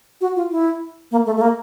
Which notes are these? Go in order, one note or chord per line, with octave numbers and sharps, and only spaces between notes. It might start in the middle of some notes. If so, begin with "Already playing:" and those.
F#4
F4
E4
A#3
A3
A3
A#3